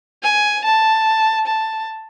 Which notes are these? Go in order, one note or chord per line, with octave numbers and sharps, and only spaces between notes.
G#5
A5
A5